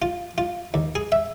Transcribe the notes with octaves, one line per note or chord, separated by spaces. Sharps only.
F4
F4
D#2
G#4
E5